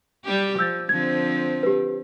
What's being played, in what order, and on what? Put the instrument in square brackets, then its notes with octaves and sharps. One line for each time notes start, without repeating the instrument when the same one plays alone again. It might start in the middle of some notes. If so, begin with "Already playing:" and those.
[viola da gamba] G3 G4
[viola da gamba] F3 [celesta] E6 G6 A6
[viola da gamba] D3 F3 C4 [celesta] G#6
[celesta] G4 B4